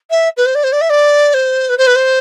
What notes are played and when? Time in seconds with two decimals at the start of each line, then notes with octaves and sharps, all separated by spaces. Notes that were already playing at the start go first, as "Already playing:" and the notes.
0.10 E5
0.37 B4
0.46 C5
0.55 D5
0.64 C5
0.72 D5
0.81 E5
0.90 D5
1.34 C5
1.69 B4
1.78 C5
1.87 B4
1.96 C5